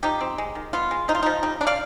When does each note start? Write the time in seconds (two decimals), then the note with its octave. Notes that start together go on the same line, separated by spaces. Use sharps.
0.03 F3 D#4 G4
0.21 C4
0.38 G#3
0.55 D#3
0.73 B3 F4
0.91 G#3
1.08 F3 D#4
1.15 F4
1.23 F3 D#4
1.43 G3 D#4
1.61 D4
1.67 D5 F5